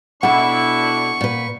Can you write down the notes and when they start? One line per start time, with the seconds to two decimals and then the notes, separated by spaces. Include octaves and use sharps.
0.23 B2 D4 E4 A4 F#5 C#6
1.21 A#2 B4